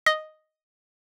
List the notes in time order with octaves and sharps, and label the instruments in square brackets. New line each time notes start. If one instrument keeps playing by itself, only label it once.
[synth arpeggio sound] D#5